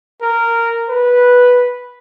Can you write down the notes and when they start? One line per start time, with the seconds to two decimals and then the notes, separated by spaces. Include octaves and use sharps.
0.22 A#4
0.89 B4